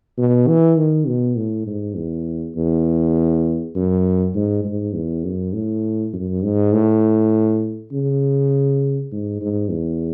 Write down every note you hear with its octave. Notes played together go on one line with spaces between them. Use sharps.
B2
E3
D#3
B2
A2
G#2
E2
E2
F#2
G#2
G#2
E2
F#2
A2
F#2
G#2
A2
C#3
G#2
G#2
E2